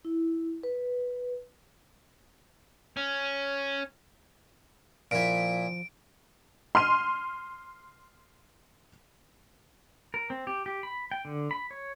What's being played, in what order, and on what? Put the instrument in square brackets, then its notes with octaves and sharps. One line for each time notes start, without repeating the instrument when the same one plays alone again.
[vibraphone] E4
B4
[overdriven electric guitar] C#4
[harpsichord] A#2 E4 [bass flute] F3 [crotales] D7
[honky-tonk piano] C6 F6 D#7
[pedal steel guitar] A#4
C4
G4
G4
B5
G5
D3
B5
C#5